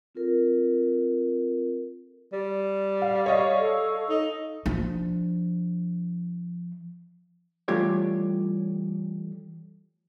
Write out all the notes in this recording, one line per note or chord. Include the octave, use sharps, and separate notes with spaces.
C4 F4 A4 A#4
G3
F5
C#5 D#5 F5
A4
D#4
F3 D4
E3 G3 A3 F4 G4 C#5